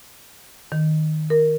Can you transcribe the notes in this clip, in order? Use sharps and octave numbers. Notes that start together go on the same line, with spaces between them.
D#3
A#4